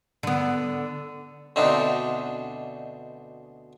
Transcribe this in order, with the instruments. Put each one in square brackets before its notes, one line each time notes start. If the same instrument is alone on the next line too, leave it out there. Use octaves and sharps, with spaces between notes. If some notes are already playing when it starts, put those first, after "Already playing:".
[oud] D3 B3
[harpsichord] D2 B2 C4 D4 D#4